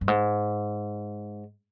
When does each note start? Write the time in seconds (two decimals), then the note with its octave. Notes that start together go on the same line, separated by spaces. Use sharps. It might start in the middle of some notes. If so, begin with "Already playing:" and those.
0.01 G2
0.08 G#2